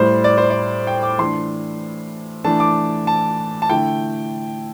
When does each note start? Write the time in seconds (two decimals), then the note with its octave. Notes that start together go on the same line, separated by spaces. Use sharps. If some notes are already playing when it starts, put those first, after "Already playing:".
Already playing: A2 G3 E4 C5
0.24 D5
0.38 C5
0.50 D5
0.87 G5
1.03 D6
1.18 E3 A3 D4 C6
2.44 E3 A3 D4 A5
2.60 D6
3.07 A5
3.62 A5
3.70 D3 A3 E4 G5